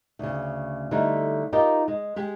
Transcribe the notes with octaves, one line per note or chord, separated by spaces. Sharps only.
D2 C#3
D3 G3 A3 D#4 E4
D#4 F4 G4 A#4 D#5
G#3
G#3 G4